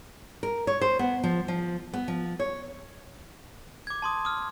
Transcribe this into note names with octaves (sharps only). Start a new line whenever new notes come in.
A#4
C#5
C5
B3
F3
F3
B3
F3
C#5
D6 G#6
A5 C6 D#6
D#6 F6